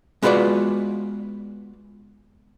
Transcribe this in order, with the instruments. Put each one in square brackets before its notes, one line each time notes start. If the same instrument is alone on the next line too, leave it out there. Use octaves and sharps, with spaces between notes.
[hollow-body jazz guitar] G#3 B3 F4 F#4 B4 D5